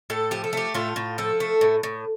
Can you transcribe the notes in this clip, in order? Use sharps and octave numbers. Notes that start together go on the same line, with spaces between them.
A2 A4
F3 G4
A4
A3 G4
A2 F4
A2
F3 A4
A3
A2
A2